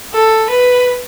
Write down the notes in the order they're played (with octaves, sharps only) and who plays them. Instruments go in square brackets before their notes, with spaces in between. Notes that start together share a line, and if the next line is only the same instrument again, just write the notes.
[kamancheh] A4
B4